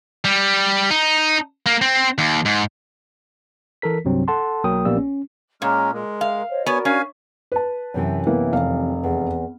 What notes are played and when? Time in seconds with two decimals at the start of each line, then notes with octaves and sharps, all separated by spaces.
0.25 G3
0.91 D#4
1.66 A#3
1.82 C4
2.18 D#2
2.46 G#2
3.82 E3 A4 A#4 B6
4.05 C2 G2 C3 F#3 C4
4.28 A4 F#5 A5 C6
4.64 B1 F#3 A#3 A#4 G5 D#6
4.85 A#1 A#3 B3 G4 D5 E6
4.97 C#4
5.62 A#2 G#3 C#4 A#5 F6
5.93 G#3 A#4
6.21 F5
6.50 C5 C#5 D#5
6.66 B3 F#4 A#4 C#5 D5 G#5
6.85 C#4 F5 G#5
7.52 B4 A5
7.94 F#2 C3 E3
8.27 A#3 B3 E4
8.53 F1 F5
9.03 E2